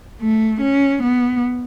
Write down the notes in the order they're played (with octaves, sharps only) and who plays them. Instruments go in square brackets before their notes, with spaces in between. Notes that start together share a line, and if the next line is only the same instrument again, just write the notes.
[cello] A3
C#4
B3